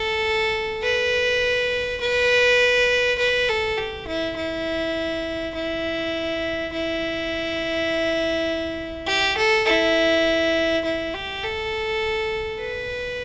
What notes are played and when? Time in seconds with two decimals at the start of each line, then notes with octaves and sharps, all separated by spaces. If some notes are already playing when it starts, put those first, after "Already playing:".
Already playing: A4
0.82 B4
2.01 B4
3.18 B4
3.48 A4
3.77 G4
4.07 E4
4.36 E4
5.54 E4
6.72 E4
9.07 G4
9.37 A4
9.67 E4
10.84 E4
11.14 G4
11.43 A4
12.61 B4